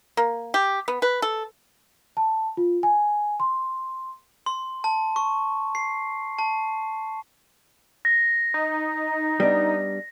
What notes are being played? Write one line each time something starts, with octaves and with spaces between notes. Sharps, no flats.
A#3
G4
B3
B4
A4
A5
F4
G#5
C6
C6
A5
C#6
C7
A5
A#6
D#4
G3 B3 D4